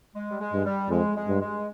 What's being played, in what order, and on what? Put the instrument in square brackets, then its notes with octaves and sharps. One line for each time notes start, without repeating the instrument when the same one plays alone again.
[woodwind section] G#3
G3
G#3
[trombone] G2
[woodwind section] G3
[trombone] F2 [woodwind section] G#3
[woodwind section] G#3
[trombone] G2
[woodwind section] G#3